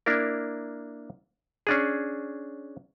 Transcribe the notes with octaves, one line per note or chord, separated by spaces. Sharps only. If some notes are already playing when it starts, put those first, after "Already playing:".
A#3 D4 E4 A#4
C#4 D4 G#4